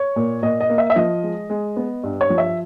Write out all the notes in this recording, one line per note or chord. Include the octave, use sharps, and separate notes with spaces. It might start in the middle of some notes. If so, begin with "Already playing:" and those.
Already playing: C#5
A#2
A#2 D#5
D#5
A#3
E5
E5
F3 D#5
G#3
G#3
B3
G2
C#5
F3
E5